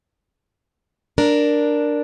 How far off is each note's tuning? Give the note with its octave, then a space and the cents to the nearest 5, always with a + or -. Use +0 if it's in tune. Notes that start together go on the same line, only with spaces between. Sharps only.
D4 +0 A#4 +0